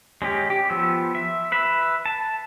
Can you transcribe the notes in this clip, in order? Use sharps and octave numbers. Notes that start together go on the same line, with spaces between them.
G#3 C#4 G4
G4
F3 B3 E6
E5
B4 E5
A5